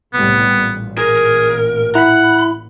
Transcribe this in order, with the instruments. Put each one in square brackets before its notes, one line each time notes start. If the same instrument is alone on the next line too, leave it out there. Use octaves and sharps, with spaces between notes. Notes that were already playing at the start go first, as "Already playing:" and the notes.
[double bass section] C2 A2 G3 [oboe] B3
[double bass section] A1 A#2
[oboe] G#4 [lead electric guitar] A#4
[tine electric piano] E4 [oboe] F#5 [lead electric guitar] A#5 B5